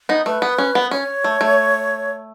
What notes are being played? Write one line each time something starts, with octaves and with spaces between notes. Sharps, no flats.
B3 D#4
A3 B4
B3
C#4
B3
C#4 C#5
A3
A3